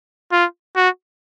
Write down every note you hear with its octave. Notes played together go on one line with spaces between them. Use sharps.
F4
F#4